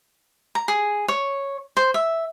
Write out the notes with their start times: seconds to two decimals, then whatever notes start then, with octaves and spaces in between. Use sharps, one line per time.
0.55 A#5
0.68 G#4
1.08 C#5
1.77 C5
1.94 E5